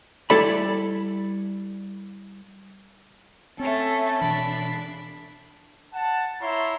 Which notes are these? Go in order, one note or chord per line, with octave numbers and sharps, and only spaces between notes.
G3 E4 A4 D5 B5
A3 C4 C#4 A4 A5
B2 E3 D4 B5
F#5 A5
E4 C#5 E5 A#5 C6